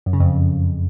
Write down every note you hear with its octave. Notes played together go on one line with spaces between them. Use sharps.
F#2
C#3
F2